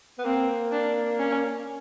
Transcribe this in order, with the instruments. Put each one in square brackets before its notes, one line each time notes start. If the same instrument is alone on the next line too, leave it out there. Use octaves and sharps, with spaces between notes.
[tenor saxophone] B3
[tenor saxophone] A#3 [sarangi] C4
[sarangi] D4
C#4